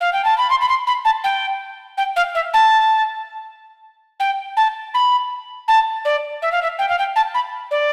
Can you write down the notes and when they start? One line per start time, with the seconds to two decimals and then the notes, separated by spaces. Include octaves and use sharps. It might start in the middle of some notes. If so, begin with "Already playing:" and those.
0.01 F5
0.13 G5
0.25 A5
0.38 B5
0.50 C6
0.61 B5
0.69 C6
0.87 B5
1.05 A5
1.24 G5
1.98 G5
2.16 F5
2.35 E5
2.54 A5
4.20 G5
4.57 A5
4.94 B5
5.68 A5
6.05 D5
6.42 E5
6.52 F5
6.63 E5
6.79 G5
6.89 F5
6.99 G5
7.16 A5
7.34 B5
7.71 D5